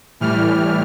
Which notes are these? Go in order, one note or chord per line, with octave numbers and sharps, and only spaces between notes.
A2 E3 G3 F6